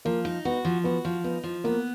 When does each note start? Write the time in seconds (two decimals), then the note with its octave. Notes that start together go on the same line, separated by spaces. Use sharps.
0.05 F3 A#3
0.25 D#4
0.45 B3 F#4
0.65 F3
0.84 B3 F#4
1.05 F3
1.24 B3 D#4
1.44 F3
1.64 A#3 B3